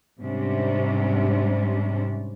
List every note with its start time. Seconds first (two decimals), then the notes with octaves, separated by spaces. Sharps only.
0.20 G#2 C3 G3 C#4 D4